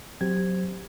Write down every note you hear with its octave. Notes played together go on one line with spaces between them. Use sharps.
F#3 C4 G4 C5 G#6